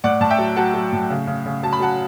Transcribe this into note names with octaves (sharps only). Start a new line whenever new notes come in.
A2 D5 F#5
A2 A5
E5 G5
F#3
F#3 F#5 A5
F#3
A2
C#3
C#3
C#3
F#3 A5
B5
F#3 F#5 A5